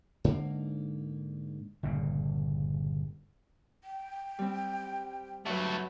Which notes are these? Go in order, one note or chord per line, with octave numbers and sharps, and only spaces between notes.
G#2 D3 A#3
G1 A#2 C#3
G5
G3 C4
G2 F#3 A3 F#4 B4 C#5